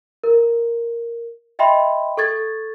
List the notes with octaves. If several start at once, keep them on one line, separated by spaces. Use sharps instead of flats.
A#4
D#5 E5 G5 B5 C6
A4 C#6 G#6 A6